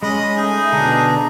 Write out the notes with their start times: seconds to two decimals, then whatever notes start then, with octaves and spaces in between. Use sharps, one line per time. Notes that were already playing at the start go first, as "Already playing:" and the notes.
0.03 G#3 C#4 D#5 B5
0.37 A3 D#4 G#4
0.73 B2 D3 D4 A#5